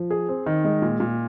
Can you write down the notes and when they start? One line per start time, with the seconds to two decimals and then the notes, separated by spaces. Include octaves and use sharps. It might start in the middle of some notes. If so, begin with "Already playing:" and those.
Already playing: F3
0.11 G#4
0.29 C4
0.46 D#3
0.64 G#3
0.82 A#2
1.00 A#2